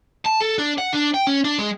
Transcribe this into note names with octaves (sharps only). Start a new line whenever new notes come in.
A5
A4
D4
F#5
D4
G5
C#4
D4
G#3